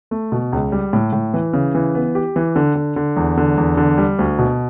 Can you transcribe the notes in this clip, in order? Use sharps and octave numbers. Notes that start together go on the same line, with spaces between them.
A3
B2
C#2
G3
A2
A2
E3
C#3
E3
B3
G4
E3
D3
D3
D3
E2
D3
E2
D3
G3
D2
B2